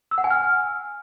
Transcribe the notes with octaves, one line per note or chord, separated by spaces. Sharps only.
E6
F#5
G#5
F6